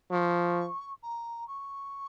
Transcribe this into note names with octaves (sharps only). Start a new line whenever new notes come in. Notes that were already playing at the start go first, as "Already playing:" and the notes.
F3 C#6
A#5
C#6